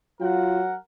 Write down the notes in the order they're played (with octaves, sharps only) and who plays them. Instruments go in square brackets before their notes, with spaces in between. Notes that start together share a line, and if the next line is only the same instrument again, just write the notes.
[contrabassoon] F#3 [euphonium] F4 [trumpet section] A#4 F#5